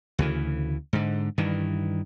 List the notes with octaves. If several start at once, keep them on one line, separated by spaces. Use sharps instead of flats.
D2 C#3 E3
G#2 D3
G2 D#3 E3